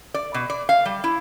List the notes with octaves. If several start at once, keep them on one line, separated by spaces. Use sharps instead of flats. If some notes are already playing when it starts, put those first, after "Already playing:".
D5
B2
D5
F5
G3
E4